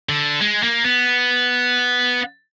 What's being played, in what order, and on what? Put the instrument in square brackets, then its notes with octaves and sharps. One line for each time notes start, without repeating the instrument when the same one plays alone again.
[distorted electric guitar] D3
G#3
A#3
B3